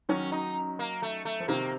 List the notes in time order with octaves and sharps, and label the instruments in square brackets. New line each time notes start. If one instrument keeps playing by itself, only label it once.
[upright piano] D#3 F#3 [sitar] C#4
[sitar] D#4
A#3
A3
A3
[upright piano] F3
[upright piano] C3 D#3 [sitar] A#3